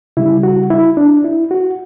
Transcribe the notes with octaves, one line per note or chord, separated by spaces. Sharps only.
C#3 G3 E4
F#4
E4
D4
E4
F#4